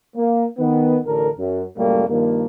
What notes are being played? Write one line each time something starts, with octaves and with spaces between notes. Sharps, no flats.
A#3
D#3 B3
A1 D3 A4 A#4
F#2
C#2 F#2 A2 G3 A3 A#3
G2 D#3 F3 A#3